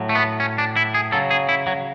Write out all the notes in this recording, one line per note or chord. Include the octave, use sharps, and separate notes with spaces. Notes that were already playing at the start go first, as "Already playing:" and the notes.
Already playing: A2 F#3
A3
B3
C#4
D4
E4
G#4
C#3 F#3 A4
G#4
E4
F#3